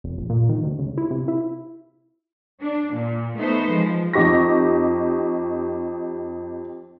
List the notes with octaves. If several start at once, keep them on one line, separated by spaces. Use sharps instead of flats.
F1
A#1
A#2
D#3
D2
C#2
E4
C3
E4
D4
A#2
A3 B3 D#4 B4 C5
F3 G#3
F2 D#4 G4 C#6 A#6